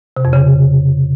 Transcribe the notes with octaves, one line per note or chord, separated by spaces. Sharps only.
C3
F2
C#3